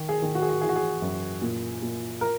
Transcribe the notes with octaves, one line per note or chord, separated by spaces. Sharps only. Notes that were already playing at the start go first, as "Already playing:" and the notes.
Already playing: D#3
G#4
D#3
F#4
G#4
F#4
E3 G#4
F#4
G#4
F#2
A#2
A#2
A#4